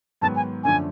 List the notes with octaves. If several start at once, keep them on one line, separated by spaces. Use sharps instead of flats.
G#2 D#3 F#3 B3 A5
G#5
F#2 D3 F3 A3 D4 G#5